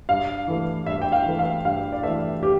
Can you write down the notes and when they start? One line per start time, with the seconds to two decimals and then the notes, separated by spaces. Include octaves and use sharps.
0.09 G2 F5
0.47 E3 A3
0.86 G2 E5
1.01 G5
1.12 F5
1.26 E3 A3
1.39 F5
1.65 G2 F5
1.92 D5
2.03 E3 A3 E5
2.43 G4